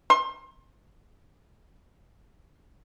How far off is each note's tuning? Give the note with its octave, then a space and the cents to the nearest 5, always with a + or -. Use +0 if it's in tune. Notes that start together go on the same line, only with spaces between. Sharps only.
C6 +30